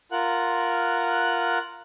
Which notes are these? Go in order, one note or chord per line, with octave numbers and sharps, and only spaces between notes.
F4 A#4 F#5 F#6